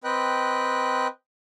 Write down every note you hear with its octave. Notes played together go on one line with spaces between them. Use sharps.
C4 B4 D#5 G5 F#6